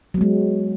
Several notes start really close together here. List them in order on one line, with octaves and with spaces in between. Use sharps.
F#3 B3 G#3